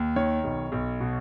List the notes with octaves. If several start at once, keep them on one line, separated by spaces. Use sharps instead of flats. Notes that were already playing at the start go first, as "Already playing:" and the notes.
Already playing: D#2
D#3 C#5
B1
B1
B2